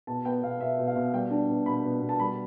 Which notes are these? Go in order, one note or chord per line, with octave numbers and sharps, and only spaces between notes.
B2 A5
B3 G5
B2 F5
B2 E5
B2
F5
B2
G3 G5
D4
B2
B2 B5
B2
B2
A5
G3 B5